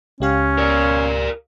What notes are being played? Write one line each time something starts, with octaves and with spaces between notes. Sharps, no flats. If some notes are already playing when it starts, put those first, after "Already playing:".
C#2 C#4 G4 F5
A#4 D5